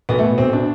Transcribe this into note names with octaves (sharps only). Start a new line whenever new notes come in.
B1 B3
A3
B2
B1 C4
B2 D4